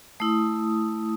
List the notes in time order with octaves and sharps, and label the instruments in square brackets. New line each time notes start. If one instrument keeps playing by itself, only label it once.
[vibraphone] A3 E4 D#6